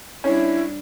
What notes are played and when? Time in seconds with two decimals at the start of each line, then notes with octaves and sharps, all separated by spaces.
0.24 G3 C#4 D4 E4